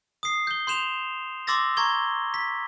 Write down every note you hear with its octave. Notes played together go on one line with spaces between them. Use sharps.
D#6 C7
G6 G7
C6 G6 E7 F7
C6 D6 E6 A6 A#6
A#5 C#6 G#6 G7
B6